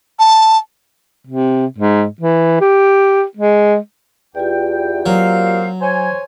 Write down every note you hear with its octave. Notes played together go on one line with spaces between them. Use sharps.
A5
C3
G#2
E3
G4
G#3
E2 F4 G4 D5 G5
F#3 A#3 C4 F5
C5 C#5 G#5